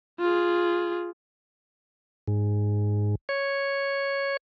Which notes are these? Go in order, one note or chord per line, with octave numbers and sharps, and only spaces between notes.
F4 G#4
G#2
C#5